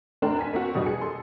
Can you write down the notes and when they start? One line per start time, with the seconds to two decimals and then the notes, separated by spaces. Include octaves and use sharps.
0.22 F1 D2 D4 A#4 G5 C6
0.39 G#5 B6
0.53 A#3 C4 F#4
0.74 F2 B2 G3 D4 D#5 D#6
0.86 G#4 C#7
1.01 A4 C6